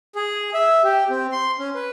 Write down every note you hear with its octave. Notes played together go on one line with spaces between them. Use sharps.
G#4
E5
G4
C4
C6
C#4
B4